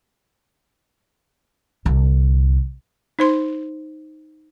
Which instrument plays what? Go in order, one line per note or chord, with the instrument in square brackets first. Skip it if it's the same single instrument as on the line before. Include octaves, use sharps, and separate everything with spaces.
[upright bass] C2 D3
[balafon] D#4 C5 C6